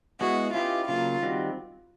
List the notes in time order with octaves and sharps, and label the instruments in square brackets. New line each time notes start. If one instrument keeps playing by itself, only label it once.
[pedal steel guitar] G#3 B3 E4 G#4 [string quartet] F#4
[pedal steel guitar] C#4 E4 G4 B4 D#5 [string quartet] F4
[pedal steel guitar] C#3 F#3 A#3 [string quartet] F4
[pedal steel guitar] D#3 G3 C4 F#4